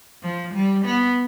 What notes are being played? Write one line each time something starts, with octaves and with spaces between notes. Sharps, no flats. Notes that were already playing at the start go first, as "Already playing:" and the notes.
F3
G3
B3